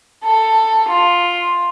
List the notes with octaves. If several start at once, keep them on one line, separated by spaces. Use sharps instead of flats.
A4
F4